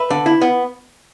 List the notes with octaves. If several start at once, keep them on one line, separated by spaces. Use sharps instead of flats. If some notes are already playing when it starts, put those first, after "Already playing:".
Already playing: B4 E5
D3
E4
B3